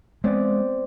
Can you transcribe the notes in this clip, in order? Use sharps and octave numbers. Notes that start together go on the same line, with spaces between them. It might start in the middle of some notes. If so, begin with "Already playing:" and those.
G#3 B3 C4 D5